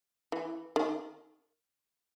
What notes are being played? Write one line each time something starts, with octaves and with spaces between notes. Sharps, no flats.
E3
D#3